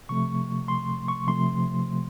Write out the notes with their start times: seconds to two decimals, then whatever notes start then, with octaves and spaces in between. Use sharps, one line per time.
0.09 C3 F3 A3 C#6
0.68 C6
1.08 C#6
1.27 C3 F3 A3 C6